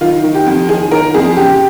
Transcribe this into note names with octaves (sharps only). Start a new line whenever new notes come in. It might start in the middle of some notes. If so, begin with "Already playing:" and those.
D#3 F4
D#3
G4
F2
D#3 G#4
D#3 A#4
F2 G#4
C#3 G4